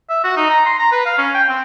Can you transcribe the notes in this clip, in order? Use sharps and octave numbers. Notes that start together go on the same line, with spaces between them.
E5
F#4
D#4
A#5
C6
A#5
B4
F5
C#4
G5
C4